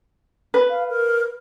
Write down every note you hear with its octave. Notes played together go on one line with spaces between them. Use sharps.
B4
F5
A#4